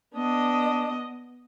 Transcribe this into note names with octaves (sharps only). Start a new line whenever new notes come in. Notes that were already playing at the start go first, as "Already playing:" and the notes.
B3 D4 D#5